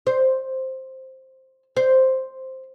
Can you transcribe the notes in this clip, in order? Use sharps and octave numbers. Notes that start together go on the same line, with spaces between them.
C5
C5